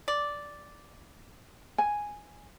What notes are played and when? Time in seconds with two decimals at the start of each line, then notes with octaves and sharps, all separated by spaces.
0.08 D5
1.78 G#5